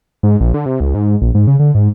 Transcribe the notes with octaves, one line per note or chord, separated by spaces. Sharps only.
G#2
A#1
D3
C3
C#2
G#2
A#1
G#2
C#3
D3
G#2